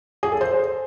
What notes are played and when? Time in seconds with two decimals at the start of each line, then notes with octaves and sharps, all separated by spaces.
0.23 G#4
0.32 A4
0.41 C5